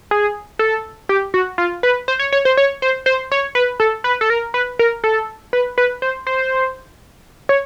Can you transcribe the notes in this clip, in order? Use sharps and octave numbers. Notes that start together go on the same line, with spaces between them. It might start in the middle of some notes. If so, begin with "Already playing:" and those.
G#4
A4
G4
F#4
F4
B4
C5
C#5
C#5
C5
C#5
C5
C5
C#5
B4
A4
B4
A4
A#4
B4
A#4
A4
B4
B4
C5
C5
C#5